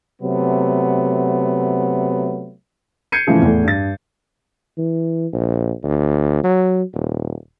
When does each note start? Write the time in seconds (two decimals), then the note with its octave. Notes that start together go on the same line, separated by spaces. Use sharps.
0.22 C3 F#3 A3 B3
3.12 G6 G#6 C7 C#7 D#7
3.27 A2 C#3 E3 F3 G#3
3.42 E2 A2 A3
3.64 G2 A6
4.78 E3
5.33 A#1
5.83 D2
6.44 F#3
6.94 D#1